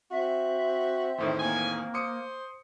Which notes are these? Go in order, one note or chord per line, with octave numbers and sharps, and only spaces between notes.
C4 F#4 E5
E2 A2 D#3 C5
A#3 G#5
C5 D6 D#6 C#7